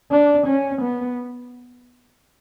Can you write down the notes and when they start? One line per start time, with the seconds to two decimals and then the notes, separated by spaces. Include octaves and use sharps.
0.11 D4
0.47 C#4
0.82 B3